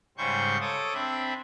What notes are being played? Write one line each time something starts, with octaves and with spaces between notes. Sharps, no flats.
G#2 C#3 G3 C5 C#6 G6
A4 C#5 D6 D#6
C4 D4 E5 B5